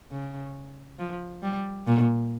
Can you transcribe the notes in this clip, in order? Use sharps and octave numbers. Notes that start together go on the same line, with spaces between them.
C#3
F3
G3
A#2